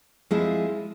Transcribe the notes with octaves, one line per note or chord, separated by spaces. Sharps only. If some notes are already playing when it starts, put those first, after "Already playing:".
F3 G#3 C4 E4 G#4